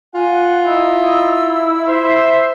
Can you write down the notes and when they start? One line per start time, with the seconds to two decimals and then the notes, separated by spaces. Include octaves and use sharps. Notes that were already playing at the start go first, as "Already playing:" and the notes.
0.15 F4 F#5 G#5
0.66 D#4 E4 D#5 E6
1.87 C5 E5 C6